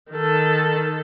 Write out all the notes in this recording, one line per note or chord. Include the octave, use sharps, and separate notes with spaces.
D#3 A4